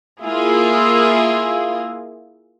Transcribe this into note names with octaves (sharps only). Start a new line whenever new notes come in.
A#3 E4 F4 G#4